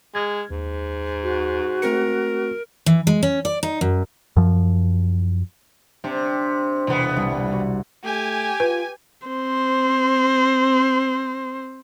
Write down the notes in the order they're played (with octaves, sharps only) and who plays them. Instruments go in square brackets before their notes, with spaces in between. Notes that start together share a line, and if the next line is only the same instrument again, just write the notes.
[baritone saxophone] G#3 [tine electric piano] F6 G#6
[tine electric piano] D#2 [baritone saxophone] G#2
[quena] F#4
[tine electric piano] A3 C4 C#7 [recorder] A#4
[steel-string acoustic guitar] E3
G#3
C#4
D5
D#4
F#2
[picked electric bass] F#2 F3
[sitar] C3 [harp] C4 D4
[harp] E1 C3 [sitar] A2 B3
[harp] C2 D5
F#4
[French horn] A3 [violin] G4 [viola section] G#5
[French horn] F4 [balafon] B4
[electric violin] C4 C5